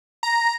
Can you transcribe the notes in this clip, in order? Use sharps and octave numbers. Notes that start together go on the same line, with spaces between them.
A#5